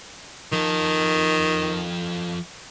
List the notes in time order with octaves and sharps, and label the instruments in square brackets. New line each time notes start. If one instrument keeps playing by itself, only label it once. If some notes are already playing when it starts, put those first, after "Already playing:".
[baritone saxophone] D#3 [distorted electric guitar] F3 A4